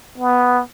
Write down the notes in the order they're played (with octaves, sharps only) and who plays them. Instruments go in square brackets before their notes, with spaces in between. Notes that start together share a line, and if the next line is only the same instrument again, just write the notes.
[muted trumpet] B3